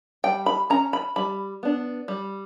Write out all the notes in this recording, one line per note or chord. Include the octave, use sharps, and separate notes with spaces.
G3 G5
B5
C#4 A#5
B5
G3 B5
B3 D4
G3